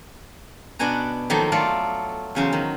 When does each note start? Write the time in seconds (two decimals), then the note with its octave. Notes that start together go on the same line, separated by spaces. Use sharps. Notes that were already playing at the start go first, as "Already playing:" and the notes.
0.79 B2 B3 D4 F#4 G#5 A#5
1.30 D#3 F3 F#3 A#3 D#4 A4
1.52 F#3 A3 F4 A4 D5
2.35 E2 C#3 F#3 C5
2.53 D#3